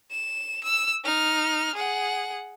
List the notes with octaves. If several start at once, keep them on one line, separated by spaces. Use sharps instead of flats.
E7
E6
D#4 F6
G#4 F#5